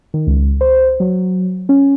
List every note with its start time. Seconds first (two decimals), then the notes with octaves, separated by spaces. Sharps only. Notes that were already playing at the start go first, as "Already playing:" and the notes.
0.14 D#3
0.27 C#2
0.61 C5
1.00 F#3
1.69 C#4